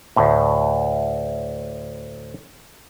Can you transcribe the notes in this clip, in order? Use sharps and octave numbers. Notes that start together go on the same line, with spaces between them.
D2 A2